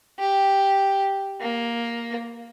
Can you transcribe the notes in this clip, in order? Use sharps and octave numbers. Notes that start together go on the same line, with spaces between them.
G4
A#3